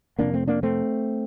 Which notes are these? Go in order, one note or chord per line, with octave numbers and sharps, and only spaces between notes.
F2 C3 A#3 D4
A3 C4
A#3 D4
A3 C4